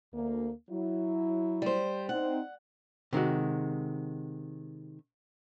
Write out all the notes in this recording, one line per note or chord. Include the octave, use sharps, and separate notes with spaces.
D2 A#3
F#3 E4
G3 C5
C4 D#4 F#5
C3 D#3 G#3 F#4